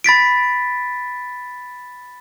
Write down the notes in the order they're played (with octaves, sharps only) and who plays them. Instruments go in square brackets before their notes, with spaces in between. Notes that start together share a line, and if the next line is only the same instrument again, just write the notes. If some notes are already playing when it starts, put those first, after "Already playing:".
[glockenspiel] B5 A6 B6 D7